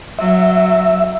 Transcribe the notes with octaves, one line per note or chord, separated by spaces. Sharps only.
F#3 E5